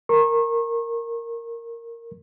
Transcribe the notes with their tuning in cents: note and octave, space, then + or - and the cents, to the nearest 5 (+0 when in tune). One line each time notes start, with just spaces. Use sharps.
A#4 -10 C#6 -35